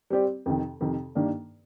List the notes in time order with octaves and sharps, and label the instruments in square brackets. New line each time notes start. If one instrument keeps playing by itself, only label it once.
[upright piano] G3 C4 G4 D5
F2 C3 D#3
F2 C3 D#3
G2 D#3 A#3 D4